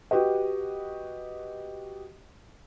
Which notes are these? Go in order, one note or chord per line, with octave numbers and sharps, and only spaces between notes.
F#4 G4 B4 D#5